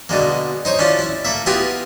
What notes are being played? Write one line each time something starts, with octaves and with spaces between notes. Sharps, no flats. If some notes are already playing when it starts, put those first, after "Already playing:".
B2 D3 G#3 A#3
D#4 C5 C#5
C#4 D4 E4 F4
E4
A3 A#3 E5
B3 E4 F4 G4 G#4 A#4